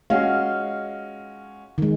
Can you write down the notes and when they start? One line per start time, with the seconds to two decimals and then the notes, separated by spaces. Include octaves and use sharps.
0.10 G#3 C#4 F#4 F5
1.78 D#3 G#3